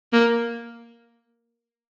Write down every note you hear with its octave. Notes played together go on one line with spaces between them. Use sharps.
A#3